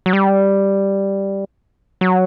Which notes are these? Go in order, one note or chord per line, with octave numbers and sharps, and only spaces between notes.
F#3
G3
F#3